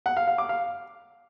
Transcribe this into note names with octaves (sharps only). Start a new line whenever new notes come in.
F#5
F5
F5
D6
F5